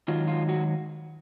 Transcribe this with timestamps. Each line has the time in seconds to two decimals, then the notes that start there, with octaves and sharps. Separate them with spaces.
0.08 G#2 D#3 F#3 F4
0.28 F4
0.49 F#4